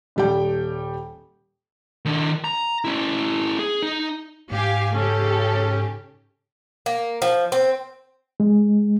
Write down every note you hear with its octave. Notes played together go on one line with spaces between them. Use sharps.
D#1 G3 G5
D#3 D4
A#5
C#4 E4
G#4
D#4
G#2 G4 F5 G#5
C#3 C#4 G4 A4
A#3
F3
C4
G#3